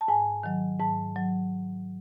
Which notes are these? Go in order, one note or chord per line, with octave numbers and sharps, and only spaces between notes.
A5
G#2 G#5
D#3 F#3
G#2 A5
F#3